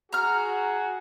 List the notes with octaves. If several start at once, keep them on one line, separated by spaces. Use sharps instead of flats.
F#4 G#4 A#5 F6